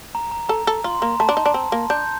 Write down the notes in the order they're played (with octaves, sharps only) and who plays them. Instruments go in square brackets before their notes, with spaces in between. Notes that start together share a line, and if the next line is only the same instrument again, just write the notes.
[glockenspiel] A#5
A#5
[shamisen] A4 [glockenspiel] A#5
[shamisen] A4
[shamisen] F4 [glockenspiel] C6
[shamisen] A#3 [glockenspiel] A#5
[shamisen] A3 [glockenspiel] A5
[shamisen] D4
D#4
D4
C4
A#3
[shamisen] D4 [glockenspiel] G6